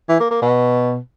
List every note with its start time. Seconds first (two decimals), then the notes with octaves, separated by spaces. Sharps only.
0.09 E3
0.20 A#3
0.31 A#3
0.42 B2